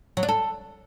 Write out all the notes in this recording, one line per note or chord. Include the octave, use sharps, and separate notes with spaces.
F#3
D4
A4